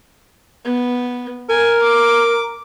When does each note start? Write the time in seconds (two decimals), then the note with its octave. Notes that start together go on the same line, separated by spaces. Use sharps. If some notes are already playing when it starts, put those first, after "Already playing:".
0.65 B3
1.49 A#4 G#5
1.82 D6